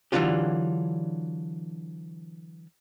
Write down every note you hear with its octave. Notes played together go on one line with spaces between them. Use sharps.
D3 E3 F#3 D4 F4 G4